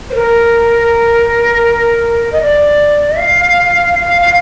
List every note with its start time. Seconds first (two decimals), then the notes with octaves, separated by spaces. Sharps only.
0.10 C5
0.14 A#4
2.32 D#5
2.41 D5
3.18 F5
3.93 F5
4.21 F5